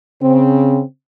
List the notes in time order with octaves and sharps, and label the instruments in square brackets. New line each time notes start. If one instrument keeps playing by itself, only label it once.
[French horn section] C#3 C4